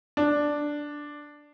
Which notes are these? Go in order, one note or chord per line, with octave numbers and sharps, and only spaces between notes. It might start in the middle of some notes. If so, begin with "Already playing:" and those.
D4